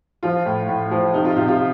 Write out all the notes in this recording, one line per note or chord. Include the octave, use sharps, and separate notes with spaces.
F3 F4
A2
A2
F3
C3 D#4
F4
C3 F4
F4